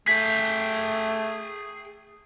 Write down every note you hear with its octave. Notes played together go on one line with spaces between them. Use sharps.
A3 G#4 G5 B6